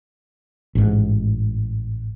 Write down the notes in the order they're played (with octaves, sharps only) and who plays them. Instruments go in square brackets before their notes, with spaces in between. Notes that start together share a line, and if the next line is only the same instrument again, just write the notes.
[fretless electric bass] A1 G#2